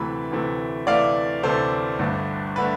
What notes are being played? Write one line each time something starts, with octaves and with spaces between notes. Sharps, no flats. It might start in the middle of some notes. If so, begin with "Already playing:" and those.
Already playing: D2 C3 E3 A3 B4
D2 C3 E3 A3
D2 C3 E3 A3 D5 F5
D2 C3 E3 A3 A4 C5
G1 G2 D3 A3
D3 A3 B4